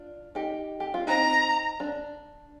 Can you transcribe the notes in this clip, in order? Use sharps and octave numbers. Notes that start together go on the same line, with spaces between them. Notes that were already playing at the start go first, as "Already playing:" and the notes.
Already playing: D4 F4
D#4 G4
G4
F4
C4 D#4 A#5
D4